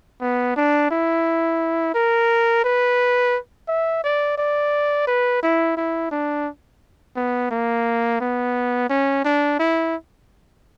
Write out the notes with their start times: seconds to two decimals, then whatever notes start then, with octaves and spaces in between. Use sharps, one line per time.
0.21 B3
0.56 D4
0.91 E4
1.95 A#4
2.64 B4
3.68 E5
4.04 D5
4.38 D5
5.07 B4
5.43 E4
5.77 E4
6.11 D4
7.16 B3
7.51 A#3
8.20 B3
8.90 C#4
9.25 D4
9.59 E4